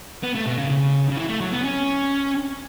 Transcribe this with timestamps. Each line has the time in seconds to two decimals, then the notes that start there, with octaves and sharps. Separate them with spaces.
0.23 B3
0.35 A3
0.46 B2
0.58 C#3
0.70 C#3
1.11 C#3
1.17 E3
1.29 A3
1.41 F#3
1.53 B3
1.64 C#4